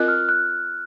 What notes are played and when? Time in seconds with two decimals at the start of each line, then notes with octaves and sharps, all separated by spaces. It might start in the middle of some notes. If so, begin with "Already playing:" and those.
Already playing: C4 F4 A#4 D#5 F#6
0.08 F6
0.29 F#6